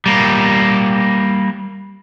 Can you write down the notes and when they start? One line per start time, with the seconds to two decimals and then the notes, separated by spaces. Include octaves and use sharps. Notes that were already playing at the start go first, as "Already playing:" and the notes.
0.06 G3 A#3